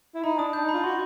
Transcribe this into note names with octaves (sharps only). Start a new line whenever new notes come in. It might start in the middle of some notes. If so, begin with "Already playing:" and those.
E4
D#4 B5
D4 D#6
D4 G6
D#4
B5
F4
F#4 C6